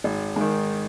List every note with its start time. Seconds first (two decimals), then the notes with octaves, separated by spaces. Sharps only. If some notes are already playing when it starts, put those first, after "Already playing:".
0.04 G#1
0.36 G#2 D#3